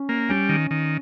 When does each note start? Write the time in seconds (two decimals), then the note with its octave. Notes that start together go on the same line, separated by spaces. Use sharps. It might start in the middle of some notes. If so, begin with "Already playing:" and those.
Already playing: C#4
0.09 A#3
0.29 G3 C#4
0.49 D#3
0.71 D#3